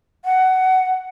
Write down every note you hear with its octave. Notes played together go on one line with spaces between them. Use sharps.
F#5